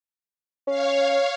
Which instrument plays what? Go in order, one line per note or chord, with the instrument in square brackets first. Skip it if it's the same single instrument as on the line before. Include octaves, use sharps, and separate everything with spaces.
[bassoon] C#4 [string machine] C#5 F5